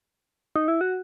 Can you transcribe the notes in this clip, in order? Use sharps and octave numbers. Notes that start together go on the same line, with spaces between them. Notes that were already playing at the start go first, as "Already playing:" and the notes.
D#4
E4
F#4